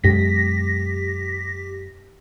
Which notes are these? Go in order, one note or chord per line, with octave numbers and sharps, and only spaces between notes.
F#2 B2 G#3 G4 A#6 B6